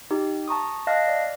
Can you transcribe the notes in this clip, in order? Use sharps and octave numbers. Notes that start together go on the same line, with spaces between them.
D#4 G4
A5 A#5 C#6 D#6
D#5 F5 A5 F6 F#6 A#6
D5